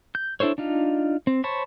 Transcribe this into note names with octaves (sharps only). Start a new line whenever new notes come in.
G6
D4 E4 A4 C5 C#5
D4 D#4 F4
C4
C5 C#5 A5 B5 C#6